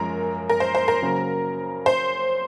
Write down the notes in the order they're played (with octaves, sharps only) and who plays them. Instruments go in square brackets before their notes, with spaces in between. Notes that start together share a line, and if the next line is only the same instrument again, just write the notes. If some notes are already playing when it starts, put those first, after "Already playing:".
Already playing: [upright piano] F#2 F3 G#3 C#4 [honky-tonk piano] A#4
[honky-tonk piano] A#4
C5
C5
A#4
[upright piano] C#3 F#3 A#3 C#4
[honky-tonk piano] C5